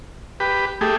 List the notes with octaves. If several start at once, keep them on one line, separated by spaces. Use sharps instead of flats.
G4 B4
A3 G4 G#4